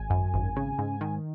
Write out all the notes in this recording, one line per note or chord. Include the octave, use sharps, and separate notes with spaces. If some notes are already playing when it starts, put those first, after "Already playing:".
Already playing: G#1 G#5
F#2
G#1
C#3
G#2
D#3